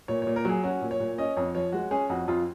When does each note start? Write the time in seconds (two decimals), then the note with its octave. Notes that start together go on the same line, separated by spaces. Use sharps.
0.08 A#2 C#5
0.22 C#5
0.27 A#2
0.36 A#4
0.45 F#3 G#4
0.64 C#4 F#4
0.82 A#2
0.91 C#5
1.00 A#2
1.18 C#4 D#5
1.37 F2 C#5
1.55 F3 C#5
1.72 G#3 F#4
1.91 C#4 G#4
2.10 F2 F#4
2.28 F2 F4